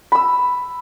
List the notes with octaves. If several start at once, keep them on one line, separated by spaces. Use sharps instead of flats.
B5 E6